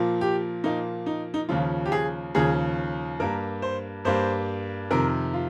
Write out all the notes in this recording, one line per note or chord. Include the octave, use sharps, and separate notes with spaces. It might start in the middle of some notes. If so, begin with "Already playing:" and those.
Already playing: A#2 F3 A#3
G4
A#2 F3 A#3 D#4
D#4
D#4
D#2 C#3 F3 F4
G4
G#4
D#2 C#3 F3 G#4
G2 G3 A#3 A#4
C5
G2 G3 A#3 C5
F2 C3 D#3 A#4
F4